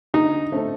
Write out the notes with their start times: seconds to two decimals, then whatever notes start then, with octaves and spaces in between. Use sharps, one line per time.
0.14 D3 D#4
0.52 A3 C4 D#4 A4